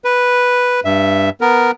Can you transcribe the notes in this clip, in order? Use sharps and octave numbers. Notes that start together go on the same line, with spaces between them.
B4
G2 E5
B3 A#4